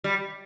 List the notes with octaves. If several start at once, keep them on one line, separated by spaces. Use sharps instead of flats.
G3